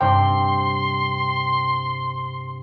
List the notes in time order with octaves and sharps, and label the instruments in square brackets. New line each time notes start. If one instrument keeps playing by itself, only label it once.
[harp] G2 C3 [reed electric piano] G5 [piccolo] C6